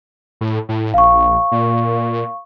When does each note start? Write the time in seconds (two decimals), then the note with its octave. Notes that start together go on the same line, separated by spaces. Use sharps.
0.41 A2
0.69 A2
0.94 A#1 F5 C#6
1.52 A#2